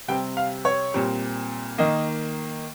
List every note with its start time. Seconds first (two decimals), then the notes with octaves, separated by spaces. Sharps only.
0.08 C3 G3 C4 G5
0.37 F5
0.65 C#5
0.94 A#2 G3 C4
1.78 D#3 A#3 D#5